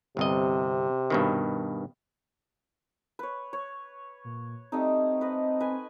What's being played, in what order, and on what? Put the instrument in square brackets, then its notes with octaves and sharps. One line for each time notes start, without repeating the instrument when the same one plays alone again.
[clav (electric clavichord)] G1 C2 D#5 [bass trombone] C3
[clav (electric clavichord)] G2 B2 D#3
[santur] B4 C#5
C#5
[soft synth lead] A#2
[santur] G3 A3 D#4 [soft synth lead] C4
[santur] B4 D#5
B4 G#5